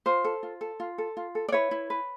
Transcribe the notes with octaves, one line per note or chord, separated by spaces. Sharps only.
F4 C5
A4
F4
A4
F4
A4
F4
A4
D5
E4 B4 C#5
E4
B4